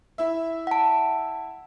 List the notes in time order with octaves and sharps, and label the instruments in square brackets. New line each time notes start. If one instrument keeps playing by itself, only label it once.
[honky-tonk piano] E4 E5
[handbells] F#5 A5